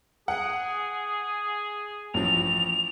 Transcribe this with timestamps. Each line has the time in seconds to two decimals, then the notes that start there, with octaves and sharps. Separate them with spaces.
0.28 G#4 F#5
2.14 A1 F3 F7